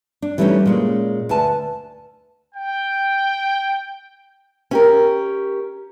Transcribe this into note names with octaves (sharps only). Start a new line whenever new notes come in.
D4
E3 G3 A3 A#3 C#4 D#4
A#2 G#3 C#4
D2 B4 G#5 A5
G5
C#4 G4 A#4